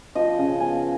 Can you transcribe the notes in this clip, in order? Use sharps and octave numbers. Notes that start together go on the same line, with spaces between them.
F3 D#5
C#3
B3 G#5